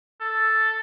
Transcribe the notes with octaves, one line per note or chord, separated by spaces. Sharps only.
A4